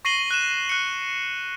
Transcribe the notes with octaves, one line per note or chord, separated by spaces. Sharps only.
C#6 A#6 C7 D#7 F#7 G7
F#6 D#7 E7
F#6 C#7